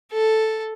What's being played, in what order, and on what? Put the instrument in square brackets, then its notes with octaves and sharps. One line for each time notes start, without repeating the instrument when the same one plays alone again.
[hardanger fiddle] A4